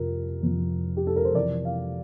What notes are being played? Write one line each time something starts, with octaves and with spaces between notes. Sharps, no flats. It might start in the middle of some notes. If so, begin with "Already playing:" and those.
Already playing: F2 C3 F3 A#4
F2 C3 F3
G4
A4
A#4
C5
F2 C3 E3 D5
F5